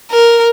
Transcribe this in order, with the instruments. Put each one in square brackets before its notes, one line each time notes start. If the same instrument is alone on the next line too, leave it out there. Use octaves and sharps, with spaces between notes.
[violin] A#4